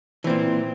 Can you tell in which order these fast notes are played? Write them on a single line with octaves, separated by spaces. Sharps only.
E3 C4 A#2